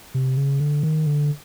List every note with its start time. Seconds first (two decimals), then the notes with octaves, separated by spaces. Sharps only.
0.14 C3
0.37 C#3
0.60 D3
0.83 D#3
1.06 D3